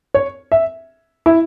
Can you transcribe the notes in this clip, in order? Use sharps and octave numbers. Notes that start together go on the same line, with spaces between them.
C#5
E5
E4